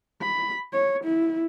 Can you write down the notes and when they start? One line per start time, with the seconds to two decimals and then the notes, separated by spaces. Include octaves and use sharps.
0.22 B5
0.73 C#5
1.04 E4